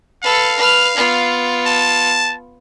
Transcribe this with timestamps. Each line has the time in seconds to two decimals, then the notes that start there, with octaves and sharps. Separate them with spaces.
0.23 A4 B4 F5
0.56 B4 F6
0.96 B3 F4
1.66 A5